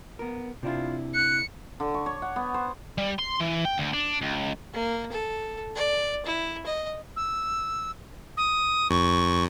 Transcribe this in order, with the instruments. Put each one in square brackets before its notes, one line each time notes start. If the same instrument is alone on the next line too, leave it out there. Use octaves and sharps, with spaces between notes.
[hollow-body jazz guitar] B3 A#4
[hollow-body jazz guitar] C3 D4 E4 [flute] F4
[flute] F#6 [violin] C#7
[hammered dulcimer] D3
C#6
C#5
F#5
B3
C5
[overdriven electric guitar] G3
C6
E3
G5
D2
D4
C#2
[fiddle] A#3
A4
D5
E4
D#5
[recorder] E6
D#6
[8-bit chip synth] F2 [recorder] C#6